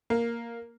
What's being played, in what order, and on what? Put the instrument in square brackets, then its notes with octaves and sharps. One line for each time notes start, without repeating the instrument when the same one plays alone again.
[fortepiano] A#3